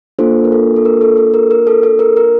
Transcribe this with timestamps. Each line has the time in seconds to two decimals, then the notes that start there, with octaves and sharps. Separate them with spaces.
0.19 A#3 D4 F4 A4 C5
0.45 A#4
0.52 A4
0.76 A4
0.85 A#4
1.01 A4
1.17 A4
1.34 A#4
1.51 A#4
1.67 A4
1.83 A4
1.99 A#4
2.17 A#4